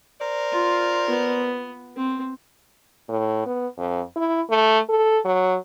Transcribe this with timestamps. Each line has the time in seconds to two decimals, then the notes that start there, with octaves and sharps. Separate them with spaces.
0.20 A#4 C5 D5
0.52 F4
1.10 B3
1.96 C4
3.09 A2
3.46 B3
3.78 F2
4.16 E4
4.50 A3
4.89 A4
5.25 F#3